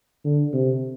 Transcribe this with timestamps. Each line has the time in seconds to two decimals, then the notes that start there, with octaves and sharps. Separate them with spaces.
0.25 D3
0.53 C3